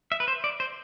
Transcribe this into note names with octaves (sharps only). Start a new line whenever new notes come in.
E5
B4
C5
D5
C5